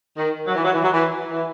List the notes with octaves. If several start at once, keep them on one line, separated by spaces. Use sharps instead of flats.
D#3
F#3
E3
F#3
E3
F#3
E3
E3